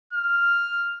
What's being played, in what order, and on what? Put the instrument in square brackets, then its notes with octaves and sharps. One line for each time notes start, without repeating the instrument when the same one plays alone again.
[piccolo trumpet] F6